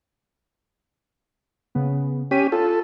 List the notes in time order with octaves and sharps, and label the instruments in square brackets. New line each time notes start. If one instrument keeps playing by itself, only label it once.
[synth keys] C#3 B3
[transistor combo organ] C#4 G4 [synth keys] B6 D#7
[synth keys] F4 [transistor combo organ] A4